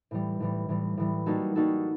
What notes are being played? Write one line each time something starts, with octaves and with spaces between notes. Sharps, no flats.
A2 E3 G3
A2 E3 G3
A2 E3 G3
A2 E3 G3
G3 A#3 D#4 F#4 A4
G3 A#3 D#4 F#4 A4